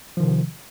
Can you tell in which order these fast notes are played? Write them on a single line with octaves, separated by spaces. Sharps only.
F3 D#3 C3